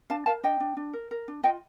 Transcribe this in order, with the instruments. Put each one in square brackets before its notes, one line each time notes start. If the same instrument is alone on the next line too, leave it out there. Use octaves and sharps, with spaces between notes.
[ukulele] D4 F5 A5
A#4 F5 A5
D4 D#5 G5
D4
D4
A#4
A#4
D4
F4 D#5 G5